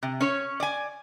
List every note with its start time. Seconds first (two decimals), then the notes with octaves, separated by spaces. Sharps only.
0.03 C3
0.21 C#4 C#5
0.60 D5 G#5